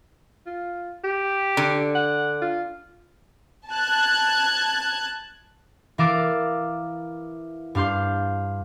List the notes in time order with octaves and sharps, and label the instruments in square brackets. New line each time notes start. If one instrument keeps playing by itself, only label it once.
[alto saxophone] F4
G4
[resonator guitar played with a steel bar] D3
[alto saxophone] F#5
F4
[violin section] A5 F#6 G#6
[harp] E3 A#4 F5 D6 E6 A6
G2 D4 F5 C6 G6